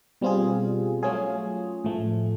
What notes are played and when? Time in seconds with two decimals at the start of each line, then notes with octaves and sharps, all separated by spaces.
0.21 B2 G3 C4 F4 G#4
1.03 F#3 A3 C#4 F4 G#4
1.84 A2 F3 A3